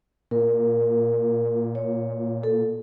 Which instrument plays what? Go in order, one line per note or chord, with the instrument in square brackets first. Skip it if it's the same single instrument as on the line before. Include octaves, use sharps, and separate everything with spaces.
[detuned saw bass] A#2 [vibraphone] A#4
[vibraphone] C#5
A4